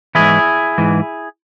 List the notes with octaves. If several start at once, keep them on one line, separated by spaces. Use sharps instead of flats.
G#2 E3 E4 G#4
G#2 E3